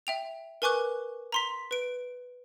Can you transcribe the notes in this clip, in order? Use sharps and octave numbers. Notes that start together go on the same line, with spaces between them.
E5 G5 F7
A#4 B4 G#5 C#6 D6 F#6
A#5 C6 B6
B4 D7